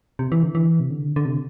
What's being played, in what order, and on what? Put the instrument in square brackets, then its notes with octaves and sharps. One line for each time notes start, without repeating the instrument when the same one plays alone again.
[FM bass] C3
E3
D3
E3
C3
D3
D3
C3